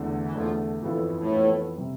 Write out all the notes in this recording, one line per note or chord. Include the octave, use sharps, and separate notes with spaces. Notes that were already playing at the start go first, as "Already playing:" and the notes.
Already playing: E2 D3 A3
E3
E2 D3 F3 A3
F2 B2 E3 B3 F4 A4
A2
G2
A2
F2 E3 B3 F4 A4
C3 G3